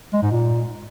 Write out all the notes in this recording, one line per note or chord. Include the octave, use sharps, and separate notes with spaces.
G#3
G#2
A#2